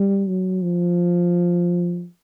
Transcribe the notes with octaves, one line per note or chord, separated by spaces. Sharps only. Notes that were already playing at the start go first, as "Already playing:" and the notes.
Already playing: G3
F#3
F3